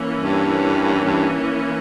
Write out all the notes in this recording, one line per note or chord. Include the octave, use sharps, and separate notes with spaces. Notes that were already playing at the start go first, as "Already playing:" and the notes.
Already playing: E3 A#3 C#4
G2
G2